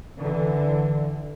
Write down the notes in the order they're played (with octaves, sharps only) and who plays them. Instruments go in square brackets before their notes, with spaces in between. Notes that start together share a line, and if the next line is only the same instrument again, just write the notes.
[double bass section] D3 E3